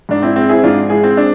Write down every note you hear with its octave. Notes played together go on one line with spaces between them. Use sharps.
G#2 D4
C4 E4
G#3 C4 E4
E4 G#4
G#2 D4 F4
G#3 E4 G#4
C4
D4